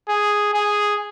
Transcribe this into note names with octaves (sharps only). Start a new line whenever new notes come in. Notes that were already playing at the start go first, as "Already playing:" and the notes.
G#4
G#4